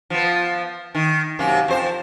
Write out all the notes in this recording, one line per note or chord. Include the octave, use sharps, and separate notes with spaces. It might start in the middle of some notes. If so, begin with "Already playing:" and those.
F3 B3
D#3
F#2 C3 A#3
F2 C5